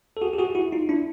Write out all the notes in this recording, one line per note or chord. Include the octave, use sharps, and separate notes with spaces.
A4
F#4 G#4
G4
F#4 G#4
E4 F#4
D#4 F4
D4 E4